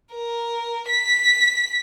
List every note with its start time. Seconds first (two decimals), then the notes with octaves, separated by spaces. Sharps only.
0.14 A#4
0.88 B6